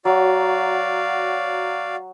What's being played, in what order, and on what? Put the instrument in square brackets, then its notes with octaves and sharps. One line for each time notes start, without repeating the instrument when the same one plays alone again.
[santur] F#3 [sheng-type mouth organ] F#4 D5 F5